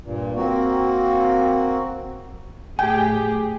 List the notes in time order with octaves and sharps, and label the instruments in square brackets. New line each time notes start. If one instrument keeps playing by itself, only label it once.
[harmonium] G2 A#2
A#3 C4 F#4
[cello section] A2 G4 G#4 [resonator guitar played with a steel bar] G5 [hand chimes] G#5